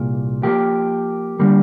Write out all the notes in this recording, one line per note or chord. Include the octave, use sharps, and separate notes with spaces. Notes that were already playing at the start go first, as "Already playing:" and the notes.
Already playing: C2 A#2 A#3
F3 A#3 G4
D3 G3 A#3